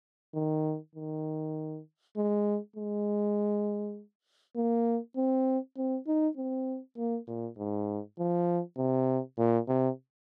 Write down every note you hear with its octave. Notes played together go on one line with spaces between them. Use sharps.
D#3
D#3
G#3
G#3
A#3
C4
C4
D#4
C4
A#3
A#2
G#2
F3
C3
A#2
C3